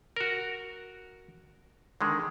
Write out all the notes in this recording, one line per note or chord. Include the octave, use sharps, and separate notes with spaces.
F#4 A#4
D3 D#3 G#3